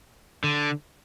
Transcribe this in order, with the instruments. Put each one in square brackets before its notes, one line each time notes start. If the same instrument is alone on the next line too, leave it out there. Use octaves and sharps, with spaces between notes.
[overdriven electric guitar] D3